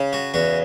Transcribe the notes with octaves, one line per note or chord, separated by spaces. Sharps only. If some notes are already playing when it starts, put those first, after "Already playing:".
Already playing: C#3
F#4
E2 F#4